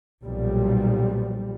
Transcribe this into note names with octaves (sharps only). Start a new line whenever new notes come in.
B1 A#2 F3 G3